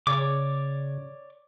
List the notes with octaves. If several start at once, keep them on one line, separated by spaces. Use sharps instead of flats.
C#3 C#5 D5 D6